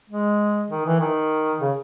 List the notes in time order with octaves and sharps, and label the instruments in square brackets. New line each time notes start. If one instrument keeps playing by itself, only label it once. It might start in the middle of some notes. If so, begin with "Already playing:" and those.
[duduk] G#3
D#3
E3
D#3
C#3